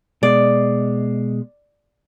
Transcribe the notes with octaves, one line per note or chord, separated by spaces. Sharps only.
B2 G#3 D5